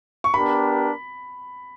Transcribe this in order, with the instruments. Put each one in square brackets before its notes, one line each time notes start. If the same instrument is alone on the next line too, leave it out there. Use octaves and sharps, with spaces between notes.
[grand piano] C#6
[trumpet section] B3 D4 G4 A#4 [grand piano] B5